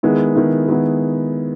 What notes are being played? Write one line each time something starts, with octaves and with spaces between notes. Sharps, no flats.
D#3 G#3 B3 E4
D#3 G#3 B3 E4
D#3 G#3 B3 E4